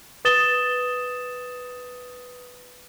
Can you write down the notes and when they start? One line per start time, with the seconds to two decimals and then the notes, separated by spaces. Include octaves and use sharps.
0.25 B4 D#6 A6 E7 G7